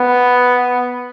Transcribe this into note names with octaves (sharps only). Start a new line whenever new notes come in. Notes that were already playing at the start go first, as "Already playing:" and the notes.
Already playing: B3